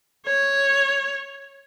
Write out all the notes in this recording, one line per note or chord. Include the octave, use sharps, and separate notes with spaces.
C#5